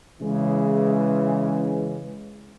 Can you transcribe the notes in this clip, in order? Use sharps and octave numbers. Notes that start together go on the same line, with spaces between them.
C#3 E3 G#3